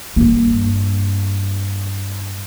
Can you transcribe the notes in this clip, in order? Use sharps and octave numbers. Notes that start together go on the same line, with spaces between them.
G2 A#3